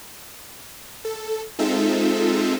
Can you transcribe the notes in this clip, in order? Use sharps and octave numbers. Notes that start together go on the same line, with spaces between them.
A4
G#3 C4 D#4 F4 A4 E5